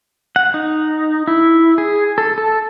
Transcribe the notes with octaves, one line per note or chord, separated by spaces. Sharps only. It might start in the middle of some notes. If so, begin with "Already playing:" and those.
F#5
D#4
E4
G#4
A4
A4